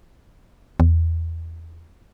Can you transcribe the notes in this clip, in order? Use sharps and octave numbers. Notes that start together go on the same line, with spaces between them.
E2